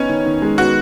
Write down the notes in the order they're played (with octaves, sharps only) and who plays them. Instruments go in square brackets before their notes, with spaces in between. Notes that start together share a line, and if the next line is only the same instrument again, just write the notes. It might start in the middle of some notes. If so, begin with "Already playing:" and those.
Already playing: [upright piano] B3 D#4 [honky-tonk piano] C#4
[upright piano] D#3
D#3
G#3
[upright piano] B3 [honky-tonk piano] F#4